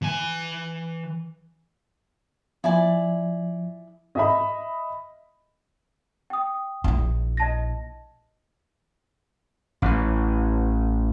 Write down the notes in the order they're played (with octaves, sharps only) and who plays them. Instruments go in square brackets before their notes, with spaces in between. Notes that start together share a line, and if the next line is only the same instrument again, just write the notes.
[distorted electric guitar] E3 G#5
[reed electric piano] F3 [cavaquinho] E4 D5 G#5
[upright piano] D#5 E5 B5
[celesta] G5 D#6
[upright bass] A#1 E4
[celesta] D#5 A5 A#6
[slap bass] A1 E3